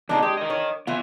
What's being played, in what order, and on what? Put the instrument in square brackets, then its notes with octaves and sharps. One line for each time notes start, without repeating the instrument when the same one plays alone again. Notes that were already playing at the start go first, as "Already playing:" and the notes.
[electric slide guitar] E2 C3 G#4 [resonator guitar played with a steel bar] D4 D#4
[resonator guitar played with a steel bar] G#3 [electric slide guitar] G4
[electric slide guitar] A#4 D#5
[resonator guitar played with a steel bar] C#5
[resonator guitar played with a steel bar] E3 F4 [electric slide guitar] B3 E5